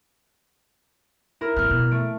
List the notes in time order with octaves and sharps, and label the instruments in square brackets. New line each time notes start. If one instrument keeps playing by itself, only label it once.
[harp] E4 A#4
[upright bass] G#1 G3 [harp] F6
[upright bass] B2
[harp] A3 D7